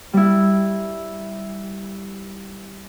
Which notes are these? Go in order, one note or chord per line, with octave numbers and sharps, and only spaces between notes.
G3 E4